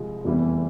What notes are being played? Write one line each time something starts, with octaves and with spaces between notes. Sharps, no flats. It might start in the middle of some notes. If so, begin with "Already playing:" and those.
Already playing: C2 C3 F3 G#3
F1 E2 E3 G3